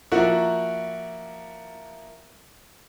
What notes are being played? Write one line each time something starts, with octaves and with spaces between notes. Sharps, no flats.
F3 A#3 E4 F#4